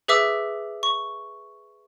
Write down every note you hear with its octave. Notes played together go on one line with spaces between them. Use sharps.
G#4 B4 E5 D6 E6
C#6